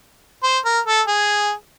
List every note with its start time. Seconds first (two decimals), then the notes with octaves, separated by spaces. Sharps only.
0.43 C5
0.65 A#4
0.86 A4
1.07 G#4